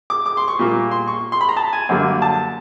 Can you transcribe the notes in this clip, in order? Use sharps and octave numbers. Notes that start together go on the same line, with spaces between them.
D6
D6
C6
C#6
A#2 G3 A#3
C6
C#6
C6
B5
A#5
A5
G#5
F#2 D3 G3 A#3
A5